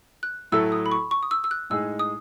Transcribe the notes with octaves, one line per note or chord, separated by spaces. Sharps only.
F#6
A2 F#3 A3 E4 A4 E6
D#6
B5
C#6
C#6
D#6
E6
E6
F#6
A2 G#3 D#4 G#4 E6
D#6